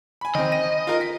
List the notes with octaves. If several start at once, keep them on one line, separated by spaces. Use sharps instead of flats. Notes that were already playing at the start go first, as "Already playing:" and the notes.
G#5 B5
D#3 C4 D#5
A#6 D#7
F4 A#4
B6